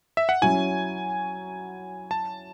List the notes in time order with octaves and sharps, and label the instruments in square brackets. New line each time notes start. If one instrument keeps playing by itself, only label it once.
[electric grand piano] E5
F#5
[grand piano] F#3 C#4 E4 [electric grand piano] G#5
[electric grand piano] A5